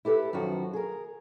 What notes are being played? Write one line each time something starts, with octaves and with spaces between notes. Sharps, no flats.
E4 G4 A4 B4
F#2 D#3 F3 F#4
G#4 A#4